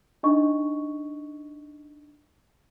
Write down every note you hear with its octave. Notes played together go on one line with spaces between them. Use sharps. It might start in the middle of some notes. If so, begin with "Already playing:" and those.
D4 D#4 D#5 C#6